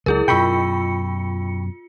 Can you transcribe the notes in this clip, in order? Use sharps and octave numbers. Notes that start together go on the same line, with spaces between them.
C#2 F#3 E4 G#4 A#4
F#2 B2 F4 G5 B5 C#6 C#7